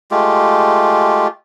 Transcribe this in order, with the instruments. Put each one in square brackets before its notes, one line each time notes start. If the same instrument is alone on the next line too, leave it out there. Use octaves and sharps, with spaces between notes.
[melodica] G#3 A3 F4 G4